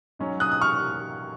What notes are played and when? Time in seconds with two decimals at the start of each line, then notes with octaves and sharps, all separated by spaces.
0.19 G#2 F#3 C#4
0.40 D#6 F#6
0.51 D#6
0.61 C#6 F6